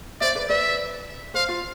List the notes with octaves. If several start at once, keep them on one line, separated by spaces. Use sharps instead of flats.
C5 D5 E5
B4 D5
B4 D5 E5
C5 F5
F4